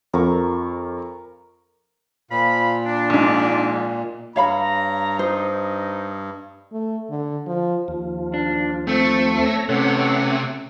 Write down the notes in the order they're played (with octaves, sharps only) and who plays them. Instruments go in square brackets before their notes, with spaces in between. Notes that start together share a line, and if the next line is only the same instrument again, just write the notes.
[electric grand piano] F2 [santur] A#4 F5 C#6
[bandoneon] A#2 [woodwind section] F3 F5 B5
[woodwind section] D4
[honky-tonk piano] A#1 G#2
[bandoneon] G2 [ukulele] C#5 F5 B5 [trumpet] A#5
[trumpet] D#4 [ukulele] C5
[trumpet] D#4
[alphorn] A3
D3
F3
[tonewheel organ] D#2 F3
[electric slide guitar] D4
[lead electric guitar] A3 [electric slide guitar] C4
[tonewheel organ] C#5 A#6
[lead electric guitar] C3 [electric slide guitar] A3 C#4 [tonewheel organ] A4 C#5 F#5